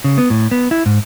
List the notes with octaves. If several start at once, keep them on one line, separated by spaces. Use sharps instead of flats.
C#3
B3
A2
B3
E4
G#2